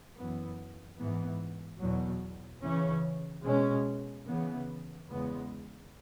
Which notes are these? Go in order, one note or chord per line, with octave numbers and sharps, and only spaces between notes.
F#2 E3 B3
G#2 E3 B3
E2 B2 F#3
C#3 E3 C#4
B2 G#3 C#4
C#3 E3 B3
E2 C#3 G#3 B3